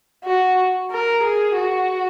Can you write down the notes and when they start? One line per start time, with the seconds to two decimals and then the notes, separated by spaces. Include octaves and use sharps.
0.25 F#4
0.91 A#4
1.23 G#4
1.57 F#4